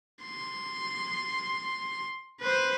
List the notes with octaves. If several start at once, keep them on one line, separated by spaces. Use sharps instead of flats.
C6
B4 C5